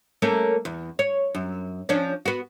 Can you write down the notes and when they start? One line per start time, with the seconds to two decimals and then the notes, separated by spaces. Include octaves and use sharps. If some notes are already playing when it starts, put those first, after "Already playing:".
0.22 A3 A#3 C#4
0.65 E2
0.99 C#5
1.35 F#2
1.89 F3 C#4 D4
2.26 B3 F#4